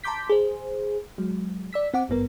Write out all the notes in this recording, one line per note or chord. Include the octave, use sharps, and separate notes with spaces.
A5 A#5 C6 D6 G6 B6
G#4 C5
F#3 G#3
D5 E6 B6
C4 F#5 D6
G#1 G2 B3 A#4